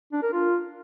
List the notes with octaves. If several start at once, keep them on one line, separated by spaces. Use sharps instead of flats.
D4
A#4
F4